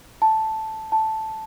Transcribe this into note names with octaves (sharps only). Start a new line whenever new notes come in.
A5
A5